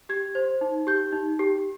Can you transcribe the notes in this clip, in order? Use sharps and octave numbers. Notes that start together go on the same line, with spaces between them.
G4 G#6
C5
D#4
G4 G6
D#4
G4